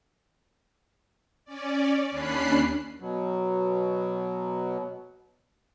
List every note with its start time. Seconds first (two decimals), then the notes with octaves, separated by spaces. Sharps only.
1.45 C#4 D5
2.11 D#2 C#4 D4 B5 F#6 C7
3.00 B2 F#3